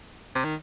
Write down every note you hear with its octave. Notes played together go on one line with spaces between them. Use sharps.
C3
D#3